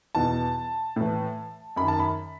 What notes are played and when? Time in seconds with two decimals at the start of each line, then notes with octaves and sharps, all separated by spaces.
0.15 E2 B2 A5
0.96 A2 E3
1.76 F#2 D#3 B5
1.88 A5
2.00 B5